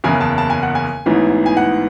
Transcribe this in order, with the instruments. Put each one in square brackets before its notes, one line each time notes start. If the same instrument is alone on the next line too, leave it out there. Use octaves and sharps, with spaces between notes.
[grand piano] F#1 E2 C#3 G#5
A5
A5
G#5
F#5
G#5
A1 G#2 E3 B3
G#5
F#5